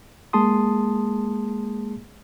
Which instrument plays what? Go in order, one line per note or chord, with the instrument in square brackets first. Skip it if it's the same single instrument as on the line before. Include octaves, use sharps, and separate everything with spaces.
[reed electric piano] G#3 A#3 G#4 A5 C6 D#6